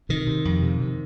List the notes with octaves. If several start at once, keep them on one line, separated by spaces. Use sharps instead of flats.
C3 D#3
C3
F2
C3
C3